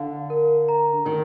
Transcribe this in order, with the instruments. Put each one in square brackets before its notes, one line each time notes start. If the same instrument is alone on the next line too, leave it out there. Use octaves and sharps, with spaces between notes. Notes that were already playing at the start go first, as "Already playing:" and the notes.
Already playing: [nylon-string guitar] D3 [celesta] F5
[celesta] A#4
A#5
[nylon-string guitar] D#3 [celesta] A#4